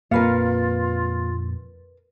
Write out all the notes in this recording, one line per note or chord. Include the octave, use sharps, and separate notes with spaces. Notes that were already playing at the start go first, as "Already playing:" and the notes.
F2 A#2 A#3 C4 F4 A#4 B4 F5